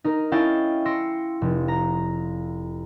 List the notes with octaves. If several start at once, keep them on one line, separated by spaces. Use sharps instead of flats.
D#4 A#4
C#4 E4 D#5 F5 G5 A5
C6 E6 A#6 C#7 D7
F1
A#5